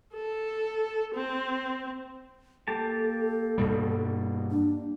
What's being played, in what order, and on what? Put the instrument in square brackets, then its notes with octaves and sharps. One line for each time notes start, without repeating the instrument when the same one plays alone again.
[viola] A4
C4
[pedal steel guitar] A#3 G4 A5 [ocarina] A4
[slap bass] G2 B2 G3
[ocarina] D4